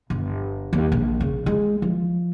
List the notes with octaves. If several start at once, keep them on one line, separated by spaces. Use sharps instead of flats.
G1
D#2
A#1
C#3
G#3
F3